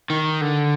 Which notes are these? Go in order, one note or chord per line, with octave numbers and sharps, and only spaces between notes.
D#3
D3